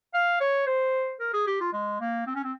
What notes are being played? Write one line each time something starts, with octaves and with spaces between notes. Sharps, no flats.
F5
C#5
C5
A#4
G#4
G4
F4
G#3
A#3
C4
C#4
C4